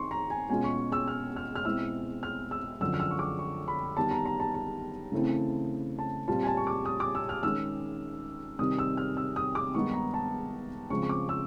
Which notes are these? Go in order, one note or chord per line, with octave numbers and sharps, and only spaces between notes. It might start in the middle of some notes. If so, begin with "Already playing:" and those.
Already playing: D#3 C4 C6 C#6
A#5
G#5
B2 G#3 C#4 F4 G#5
C#6
E6
F6
F6
F6
B2 G#3 C4 E4 E6
F6
E6
F#2 D3 F3 E6
F6
E6
C#6
D6
C#6
B5
D#3 G3 B3 A5
A#5
A#5
A5
A5
C#3 E3 A3 C4 E4
A5
A#2 G3 C4 F4 A5
G#5
A5
C#6
D6
D#6
D6
E6
F6
D#3 G#3 C#4 E6
C3 D#3 G3 D#6
E6
F6
E6
D#6
D6
G2 D#3 G#3 B3 D#4 C#6
A#5
A5
C#3 F3 G#3 C4 C#6
C#6
D6
E6